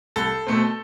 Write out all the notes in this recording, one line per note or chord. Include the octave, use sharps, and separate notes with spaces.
C2 A4
B2 A3 C4